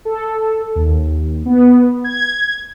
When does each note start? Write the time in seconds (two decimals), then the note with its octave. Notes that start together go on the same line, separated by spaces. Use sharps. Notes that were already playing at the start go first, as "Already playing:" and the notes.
0.05 A4
0.75 D#2
1.46 B3
2.04 G#6